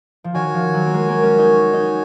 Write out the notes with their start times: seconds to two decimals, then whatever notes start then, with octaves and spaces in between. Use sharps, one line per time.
0.24 F3
0.34 D#3 F#4 C#5 G#5
0.54 F3
0.74 F#3
0.86 A#3
0.94 G#3
1.09 A#3
1.23 C#4
1.38 D#4
1.53 C#4
1.73 D#4